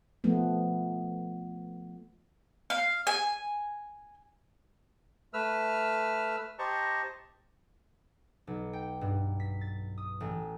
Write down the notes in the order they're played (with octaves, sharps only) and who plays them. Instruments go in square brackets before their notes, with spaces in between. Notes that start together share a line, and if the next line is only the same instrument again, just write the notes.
[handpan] F3 A3 B3
[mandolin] F5
G#5
[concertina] A3 B4 E6 F6
G4 C5 D#5 A5 A#5 C#6
[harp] B1
G5
G2
B6
A6
D#6
A1